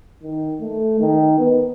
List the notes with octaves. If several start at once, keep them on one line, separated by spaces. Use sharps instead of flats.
D#3
A3
D#3
B3